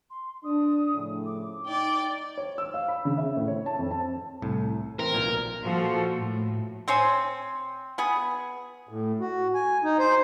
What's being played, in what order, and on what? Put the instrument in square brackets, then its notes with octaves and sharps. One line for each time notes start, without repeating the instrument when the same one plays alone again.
[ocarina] C6
[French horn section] D4 [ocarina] D#6
[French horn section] A2 C#3 F3
[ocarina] D6
[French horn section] D#4 [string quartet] D5 G5
[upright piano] C#5
E6
F5
B5
C#3
E5
A2
C#5
A5
F2
A5
[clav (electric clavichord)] C2 A2
[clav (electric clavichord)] E3 C4 A#5 [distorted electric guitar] A#4
[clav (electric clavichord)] B1 A#2
[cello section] A#2 F3 F4 F#4 A4
A2
[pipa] C4 C5 C#5 G#5
B3 G#4
[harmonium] A2
F#4
G#5
D#4
C5